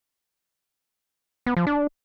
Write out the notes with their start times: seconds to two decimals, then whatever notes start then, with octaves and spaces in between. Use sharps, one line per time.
1.46 B3
1.57 F3
1.67 D4